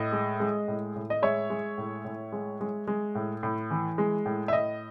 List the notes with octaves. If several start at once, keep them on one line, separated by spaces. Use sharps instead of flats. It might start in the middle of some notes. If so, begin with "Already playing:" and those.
Already playing: A2 D#5
G#3
G#3
A2
A2
D#5
G#3 C#5 E5
G#3
A2
A2
G#3
G#3
G#3
A2
A2
E3
G#3
A2
E5
A2 D#5